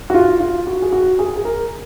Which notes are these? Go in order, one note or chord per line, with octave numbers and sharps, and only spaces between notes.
F#4
F4
F4
F#4
G#4
F#4
G#4
G#4
A#4